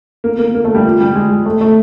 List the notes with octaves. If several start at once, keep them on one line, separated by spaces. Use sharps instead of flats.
A#3
A#3
A#3
A3
G3
F3
G3
G#3
G#3
A3
A3